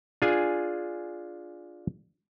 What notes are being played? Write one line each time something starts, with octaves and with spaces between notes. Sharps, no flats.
D4 F4 G#4 G#5